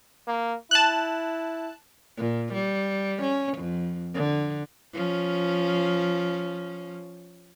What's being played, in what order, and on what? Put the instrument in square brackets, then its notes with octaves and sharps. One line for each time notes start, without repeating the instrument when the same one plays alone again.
[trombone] A#3
[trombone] E4 [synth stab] A5 F#6
[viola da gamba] A#2
G3
C#4
F2
D3
F3 C#4